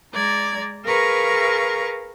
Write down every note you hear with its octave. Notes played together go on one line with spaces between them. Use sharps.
G#3 D5 A#5 G#6
G#4 A#4 B4 F5 A#5 C#6